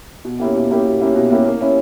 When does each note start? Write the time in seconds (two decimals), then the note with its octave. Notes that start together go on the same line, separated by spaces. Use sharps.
0.25 B2
0.40 A#3 C#4 E4 G4
0.55 B2
0.70 A#3 C#4 E4 G4
0.85 B2
1.00 A#3 C#4 E4 G4
1.15 B2
1.31 A#3 C#4 E4 G4
1.45 A#3
1.61 C#4 E4